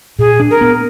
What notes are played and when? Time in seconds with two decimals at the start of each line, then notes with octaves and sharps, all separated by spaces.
0.19 A#2 G#4
0.40 D4
0.50 A#4
0.61 B3